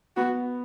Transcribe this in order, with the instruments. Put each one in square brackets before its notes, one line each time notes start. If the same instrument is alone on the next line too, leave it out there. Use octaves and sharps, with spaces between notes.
[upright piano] B3 [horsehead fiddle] F#4